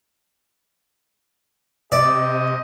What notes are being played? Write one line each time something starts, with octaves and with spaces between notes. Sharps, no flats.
C3 C4 G4 D5 D#5